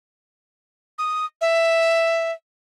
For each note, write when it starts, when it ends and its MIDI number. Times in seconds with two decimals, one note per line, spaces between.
0.99 1.26 87
1.41 2.32 76